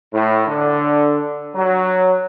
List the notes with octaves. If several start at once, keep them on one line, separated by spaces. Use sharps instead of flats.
A2
D3
F#3